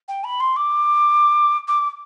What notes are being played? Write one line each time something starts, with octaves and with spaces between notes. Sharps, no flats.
G5
B5
C6
D6
D6